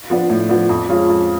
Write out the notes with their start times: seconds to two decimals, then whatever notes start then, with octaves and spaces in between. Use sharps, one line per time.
0.10 F3 B3 D4
0.30 A2
0.49 F3 B3 D4
0.69 F2
0.89 F3 G#3 C#4 F4
1.09 F2